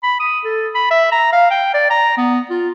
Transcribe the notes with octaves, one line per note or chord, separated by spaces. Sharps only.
B5
D#6
A4
B5
E5
A#5
F5
G5
D5
A#5
B3
F4